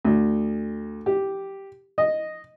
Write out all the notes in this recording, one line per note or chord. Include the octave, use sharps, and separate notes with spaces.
D2
G4
D#5